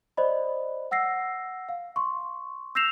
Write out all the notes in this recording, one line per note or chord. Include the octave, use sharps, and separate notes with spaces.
C5 D5 D#5 B5
F#5 E6 A#6 C7
F5
C6 C#6
E6 G6 A#6 C7 E7 F7